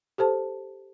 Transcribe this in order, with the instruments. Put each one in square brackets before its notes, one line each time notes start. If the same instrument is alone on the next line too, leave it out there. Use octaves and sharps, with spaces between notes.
[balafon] G4 A4 C5 A5